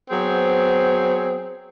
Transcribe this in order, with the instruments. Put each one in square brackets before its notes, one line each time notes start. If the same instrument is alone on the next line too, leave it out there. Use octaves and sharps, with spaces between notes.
[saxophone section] F#3 B3 C4 G#4 C5